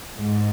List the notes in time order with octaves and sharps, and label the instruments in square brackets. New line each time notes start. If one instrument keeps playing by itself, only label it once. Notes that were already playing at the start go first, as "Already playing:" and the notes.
[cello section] G#2